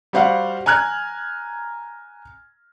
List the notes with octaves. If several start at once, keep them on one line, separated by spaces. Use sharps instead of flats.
G3 F#4 C5 F5 F#5
G#5 A#5 F6 F#6 G#6